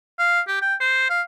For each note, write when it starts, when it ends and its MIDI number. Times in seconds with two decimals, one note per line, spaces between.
0.19 0.40 77
0.48 0.57 67
0.62 0.75 79
0.80 1.08 72
1.10 1.22 77